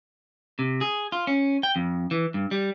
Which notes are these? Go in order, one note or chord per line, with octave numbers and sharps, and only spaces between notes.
C3
G#4
F4
C#4
G5
F2
E3
G2
G3